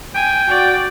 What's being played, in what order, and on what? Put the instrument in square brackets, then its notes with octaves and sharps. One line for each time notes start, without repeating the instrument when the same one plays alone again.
[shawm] G5 [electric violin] G#5
[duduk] F#4 [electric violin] D5